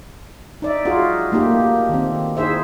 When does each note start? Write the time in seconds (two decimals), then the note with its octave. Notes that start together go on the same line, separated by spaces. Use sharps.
0.62 D#4 D5 E5
0.85 D#4 F4 F#4 G#4
1.32 A3 A#3 D#4 G4
1.89 D#3 C4
2.37 D#4 E4 G#4 C5 E5